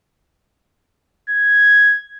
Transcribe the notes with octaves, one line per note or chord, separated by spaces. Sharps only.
G#6